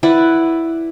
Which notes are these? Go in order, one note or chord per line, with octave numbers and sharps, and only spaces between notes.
E4 B4 D5 F#5